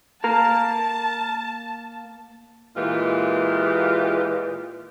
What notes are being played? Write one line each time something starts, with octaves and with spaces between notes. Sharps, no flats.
A#3 A#4 A5
A#2 E3 G#3 F4 G4